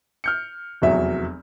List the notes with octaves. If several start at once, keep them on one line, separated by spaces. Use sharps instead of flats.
F6 G6 C#7
F1 E2 F#3 E5